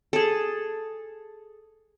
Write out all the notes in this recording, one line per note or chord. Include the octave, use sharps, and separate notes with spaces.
G#4 A4